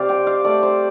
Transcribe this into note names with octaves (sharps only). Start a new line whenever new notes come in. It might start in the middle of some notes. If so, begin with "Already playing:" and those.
Already playing: C3 C5 D5 F5
C4 G5
F5
A3 D5
C5